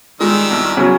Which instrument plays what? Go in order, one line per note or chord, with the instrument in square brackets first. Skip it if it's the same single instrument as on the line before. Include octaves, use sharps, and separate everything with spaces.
[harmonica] D#3 G3 E6 [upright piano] G#3 [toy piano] F4
[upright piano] C2
C#3 F#3